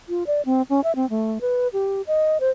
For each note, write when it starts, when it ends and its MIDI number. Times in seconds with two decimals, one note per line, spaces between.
0.09 0.23 65
0.27 0.41 74
0.45 0.62 60
0.70 0.81 61
0.84 0.95 76
0.96 1.09 60
1.10 1.38 57
1.41 1.68 71
1.73 2.02 67
2.07 2.38 75
2.40 2.50 72